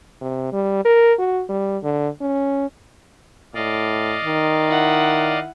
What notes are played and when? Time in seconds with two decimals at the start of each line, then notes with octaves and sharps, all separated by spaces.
0.21 C3
0.52 G3
0.85 A#4
1.19 F#4
1.49 G3
1.83 D3
2.21 C#4
3.54 A2 D5 D#5 F5
4.24 D#3
4.67 E4 F#5